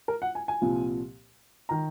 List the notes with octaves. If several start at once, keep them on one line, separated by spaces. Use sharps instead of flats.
A#4
F#5
G#5
G#5
C2 A#2 F3
D#3 A#5